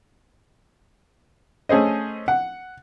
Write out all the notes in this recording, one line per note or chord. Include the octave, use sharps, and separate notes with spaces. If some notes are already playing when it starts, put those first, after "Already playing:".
A3 C#4 G#4 C5 D#5
F#5